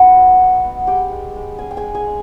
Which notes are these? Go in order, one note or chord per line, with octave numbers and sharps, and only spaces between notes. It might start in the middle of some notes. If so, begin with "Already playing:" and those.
Already playing: B3 D#4 F#4 F#5
F#3
D#4
B3
G#3 G4 G5
G#3
G#3
C#4 G#4 G#5
G5
G#4 G#5
G#3
G#4 G#5
G#3